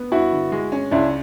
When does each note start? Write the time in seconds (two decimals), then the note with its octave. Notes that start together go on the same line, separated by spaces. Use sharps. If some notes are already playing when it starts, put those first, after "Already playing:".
Already playing: B3
0.12 G2 E4 F#4
0.32 D3
0.52 G#3
0.72 C#4
0.91 C#2 D4 E4